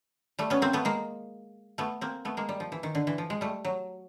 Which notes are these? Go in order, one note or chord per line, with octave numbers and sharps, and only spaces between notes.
G3 A3
B3 C#4
A#3 C4
A3 B3
G#3 A#3
A3 B3
A#3 C4
A3 B3
G#3 A#3
G3
F3
E3
D#3
D3
E3
F3
G#3
G3 A3
F#3